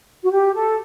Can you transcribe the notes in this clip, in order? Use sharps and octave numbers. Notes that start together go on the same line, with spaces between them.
F#4
G4
A4